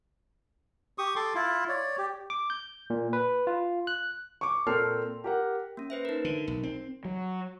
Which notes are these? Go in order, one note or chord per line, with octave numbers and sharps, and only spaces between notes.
G4 C#6 D#6
A4 C6 D6
E4 F4
C#5 D5
G4
D6
G6
A#2
B4
F4
F#6
C#6 D6
A#2 C4 A4 A#4 F6 C7
G4 A#4 F#5
A#3 C#4
B4 C5 E5
D#4 A#4
D3
B1
C4
F#3